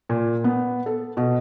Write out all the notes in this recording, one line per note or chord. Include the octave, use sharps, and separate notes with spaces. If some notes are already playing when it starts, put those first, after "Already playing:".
A#2
B3
A4
B2